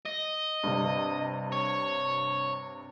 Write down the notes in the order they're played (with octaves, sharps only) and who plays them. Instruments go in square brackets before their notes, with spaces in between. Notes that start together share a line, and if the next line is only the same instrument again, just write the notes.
[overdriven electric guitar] D#5
[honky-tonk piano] G2 C3
[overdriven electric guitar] C#5